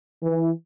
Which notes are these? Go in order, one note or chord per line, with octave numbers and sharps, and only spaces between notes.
E3